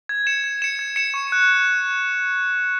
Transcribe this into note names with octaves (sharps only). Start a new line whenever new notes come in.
G#6
C#7 E7
G#6
C#7 E7
G#6
C#7 E7
C#6
F#6